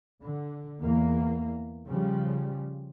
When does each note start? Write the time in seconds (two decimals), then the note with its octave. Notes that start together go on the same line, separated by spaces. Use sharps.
0.22 D3
0.80 E2 A#3
1.87 C#3 F3 G3